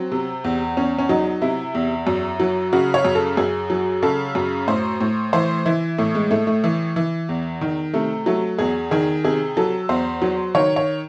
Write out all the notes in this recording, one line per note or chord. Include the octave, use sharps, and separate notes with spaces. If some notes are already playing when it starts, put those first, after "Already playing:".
Already playing: F#3 C4
C3
E2
E2 C#4
C#4
F#3 D#4
C3 E4
E2
F#2
F#3
C#3 F#4
C#5
F#2
A4
F#2 G#4
F#3
C#3 A4
F#2
A2 C5
A2
E3 C5
E3 E4
A2 A3
G#3
A2 A3
A3
E3
E3
E2
D#3
C3 A3
F#3 A3
E2 G#4
D#3 G#4
C3 G#4
F#3 A4
E2 C5
F#3
D#3 C#5
C#5